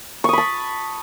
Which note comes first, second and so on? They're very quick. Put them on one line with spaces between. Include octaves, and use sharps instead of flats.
C#6 D#6 B5 A5